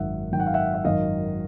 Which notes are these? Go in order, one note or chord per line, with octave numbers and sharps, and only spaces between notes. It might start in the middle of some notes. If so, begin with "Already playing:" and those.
Already playing: G#1 F#2 D#3 E5 F#5
G#1 F#2 D#3 G5
F#5
F5
E5 F#5
E5
G#1 F#2 D#3 D#5 F5